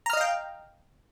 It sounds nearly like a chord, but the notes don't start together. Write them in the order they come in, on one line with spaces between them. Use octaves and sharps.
A#5 F6 D#5 F5 G5